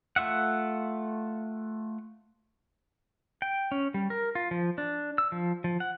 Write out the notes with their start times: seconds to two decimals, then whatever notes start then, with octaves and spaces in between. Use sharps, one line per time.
0.16 A3 F4 E5 F#5
3.42 G5
3.72 C#4
3.94 G3
4.10 A#4
4.35 F4
4.51 F3
4.78 D4
5.18 E6
5.32 F3
5.64 F3
5.80 F#5